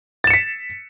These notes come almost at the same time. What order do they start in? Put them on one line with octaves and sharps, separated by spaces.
A6 E7 C#7 B6